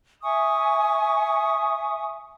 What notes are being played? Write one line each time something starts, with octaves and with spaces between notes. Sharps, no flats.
E5 G#5 C#6 D#6